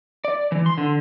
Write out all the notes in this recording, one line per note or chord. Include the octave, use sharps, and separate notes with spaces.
D5
E3
C6
D3